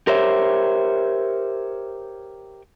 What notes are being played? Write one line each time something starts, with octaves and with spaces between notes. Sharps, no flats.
G4 A#4 C5 C#5 E5